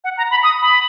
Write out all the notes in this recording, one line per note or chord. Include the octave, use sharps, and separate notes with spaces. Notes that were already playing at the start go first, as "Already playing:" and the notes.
F#5
A#5
B5
D#6
B5